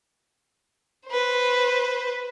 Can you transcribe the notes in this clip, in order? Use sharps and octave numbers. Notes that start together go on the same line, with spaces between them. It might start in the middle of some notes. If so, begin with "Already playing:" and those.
B4 C5